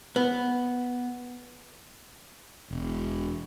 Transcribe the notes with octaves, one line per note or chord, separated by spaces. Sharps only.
B3
E1